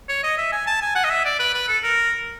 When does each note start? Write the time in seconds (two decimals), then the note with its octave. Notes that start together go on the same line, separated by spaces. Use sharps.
0.09 C#5
0.23 D#5
0.37 E5
0.52 G#5
0.67 A5
0.81 G#5
0.95 F#5
1.04 D#5
1.10 E5
1.25 D5
1.39 B4
1.54 B4
1.68 A4
1.83 A#4